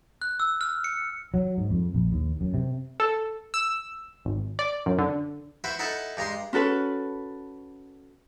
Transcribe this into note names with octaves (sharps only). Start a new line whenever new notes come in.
F#6
E6
F6
C#7
F#3
G#2
F2
A#1
D#2
F#2
C3
A4
E6
G#1
D5
F#2
D3
E4 F#4 B4 C5
D#4 E4 A4 F#5 A5
G2 G#3 A#5 C6
C#4 F#4 A4 B4